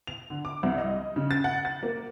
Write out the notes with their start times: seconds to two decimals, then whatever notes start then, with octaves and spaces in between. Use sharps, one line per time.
0.07 F7
0.30 D3
0.45 D6
0.63 C2
0.78 D#5
1.16 C#3
1.31 A6
1.44 F#5
1.65 A6
1.83 A#3